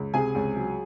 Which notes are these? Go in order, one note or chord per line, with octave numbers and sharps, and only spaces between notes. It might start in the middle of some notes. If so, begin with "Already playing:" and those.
Already playing: C#2
C3 G#4 G#5
C#2
F#3